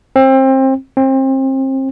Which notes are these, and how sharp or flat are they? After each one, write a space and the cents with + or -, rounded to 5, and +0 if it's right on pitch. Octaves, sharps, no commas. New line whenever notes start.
C4 +25
C4 +30